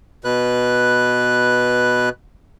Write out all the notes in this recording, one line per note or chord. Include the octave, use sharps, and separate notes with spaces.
B2 B4 F#6